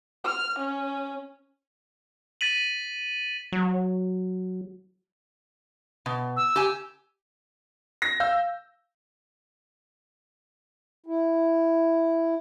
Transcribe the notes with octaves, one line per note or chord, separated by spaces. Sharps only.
F6
C#4
A6 B6 D#7 F#7
F#3
B2
E6
G4 G#5
A#6
F5 E6 G6
E4